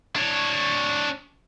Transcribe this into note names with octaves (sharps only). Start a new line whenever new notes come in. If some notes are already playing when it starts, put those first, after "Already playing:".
D4 C#5